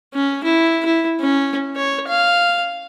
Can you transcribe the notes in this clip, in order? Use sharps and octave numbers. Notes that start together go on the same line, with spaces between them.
C#4
E4
E4
C#4
C#5
F5